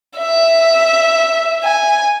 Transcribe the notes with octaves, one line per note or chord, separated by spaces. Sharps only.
E5
G#5